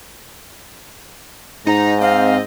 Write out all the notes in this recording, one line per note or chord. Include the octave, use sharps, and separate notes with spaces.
G#2 D#4 A#5
C4 D#5 F5